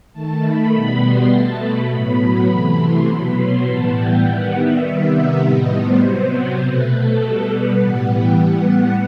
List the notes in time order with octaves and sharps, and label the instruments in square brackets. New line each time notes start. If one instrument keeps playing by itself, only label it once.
[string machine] D#3 A3 A5
B5
B2 G3 B3
C6
B2 A3 A5
B5
A2 F#3 B3 B5
C3 E3 A3
C6
B2 F#3 B3 B5
C6
A2 E3 G3 B3 A5
G5
D#3 G3 B3 F#5
E5
C3 D#3 G3 B3 E5
E5
A2 G3 B3 D#5
C5
C3 F#3 B3 C5
C5
B2 A3 B4
A4
B2 G3 B3
B4
A2 E3 G3 B3 F#5
G5
A2 G3 B3 F#5